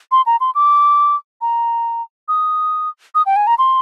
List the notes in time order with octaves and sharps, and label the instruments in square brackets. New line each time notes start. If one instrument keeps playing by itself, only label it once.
[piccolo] C6
A#5
C6
D6
A#5
D#6
D#6
G5
G#5
A#5
C6